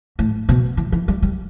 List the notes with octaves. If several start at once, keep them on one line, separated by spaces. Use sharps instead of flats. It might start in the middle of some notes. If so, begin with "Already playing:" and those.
A2
B2
E3
E3
G3
G3